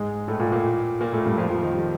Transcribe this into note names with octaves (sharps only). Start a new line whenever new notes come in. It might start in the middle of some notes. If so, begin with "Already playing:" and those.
Already playing: G#2 G#3
A2 A3
A#2 A#3
A#2 A#3
A#2 A#3
A2 A3
G2 G3
F2 F3
F2 F3
D#3
G3